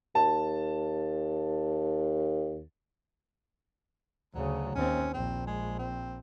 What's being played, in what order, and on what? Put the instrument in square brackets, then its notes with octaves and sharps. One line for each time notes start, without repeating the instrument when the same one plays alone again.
[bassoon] D#2 [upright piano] A5
[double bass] D2 C#3 [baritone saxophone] F#3
[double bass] D#2 C4 [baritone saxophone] C#4
[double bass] A#1 [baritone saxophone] C4
[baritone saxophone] G#3
C4